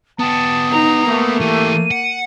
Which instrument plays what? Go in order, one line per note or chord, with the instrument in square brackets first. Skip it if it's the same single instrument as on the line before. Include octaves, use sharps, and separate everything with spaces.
[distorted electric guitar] B3 G4 [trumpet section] A5 [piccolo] D#6
[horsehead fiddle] D#4 A#5
[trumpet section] A3 [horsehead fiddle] A#3
[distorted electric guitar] E3 G4 [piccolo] D#7
[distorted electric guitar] F#5